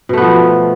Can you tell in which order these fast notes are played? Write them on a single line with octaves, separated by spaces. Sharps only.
B2 A3 B3 F3